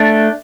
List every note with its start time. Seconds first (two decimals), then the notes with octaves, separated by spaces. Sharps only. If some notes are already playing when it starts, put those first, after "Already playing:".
Already playing: A3 D4